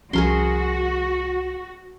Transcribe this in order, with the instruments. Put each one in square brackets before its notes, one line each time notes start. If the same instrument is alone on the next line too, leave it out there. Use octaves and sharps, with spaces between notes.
[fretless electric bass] C2 F3 C#4 [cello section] F#4 [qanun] G#4 A#4 C6